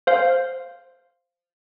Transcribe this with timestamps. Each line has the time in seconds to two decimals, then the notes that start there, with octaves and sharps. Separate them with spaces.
0.07 C5 F5